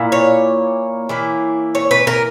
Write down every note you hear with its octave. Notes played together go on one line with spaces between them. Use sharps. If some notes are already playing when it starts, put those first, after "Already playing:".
Already playing: A#2 A#3 E4
C#5
E3 A#3 E4
C#5
B4
A#4